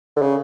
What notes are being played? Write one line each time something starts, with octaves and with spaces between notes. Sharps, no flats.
D3
C#3